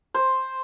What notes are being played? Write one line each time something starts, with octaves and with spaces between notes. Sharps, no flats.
C5